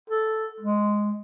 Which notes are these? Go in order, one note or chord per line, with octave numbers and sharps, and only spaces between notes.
A4
G#3